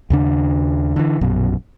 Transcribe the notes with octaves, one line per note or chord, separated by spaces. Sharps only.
D#2 C#3 D4
D3 E3
A#1 F#2 B2